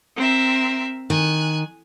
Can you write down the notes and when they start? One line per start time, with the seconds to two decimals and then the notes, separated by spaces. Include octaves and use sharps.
0.16 C4 A#4 E5
1.10 D#3 G#5 F#6